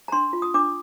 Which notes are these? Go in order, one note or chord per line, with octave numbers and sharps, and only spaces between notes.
A#5
D4 C6
F4
D#6
D4 D6